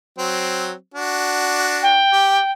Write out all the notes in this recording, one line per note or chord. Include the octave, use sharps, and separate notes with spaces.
F#3 C4
D4 F#4
G5
G4